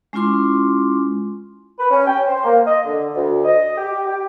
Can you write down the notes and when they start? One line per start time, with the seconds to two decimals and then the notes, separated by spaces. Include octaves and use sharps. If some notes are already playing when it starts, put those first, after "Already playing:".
0.13 G#3 C#4 E4 F4 C6 D6
1.79 B4
1.91 C#4
2.07 G5
2.28 C5
2.45 A#3
2.67 D#5
2.85 D3
3.15 D2
3.45 D#5
3.78 G4
4.07 G4